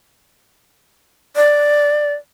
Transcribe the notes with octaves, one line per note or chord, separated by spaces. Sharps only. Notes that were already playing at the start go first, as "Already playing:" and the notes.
D5